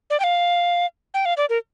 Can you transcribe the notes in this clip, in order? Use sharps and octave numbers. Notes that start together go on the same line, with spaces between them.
D5
G5
F5
G5
F5
D5
A#4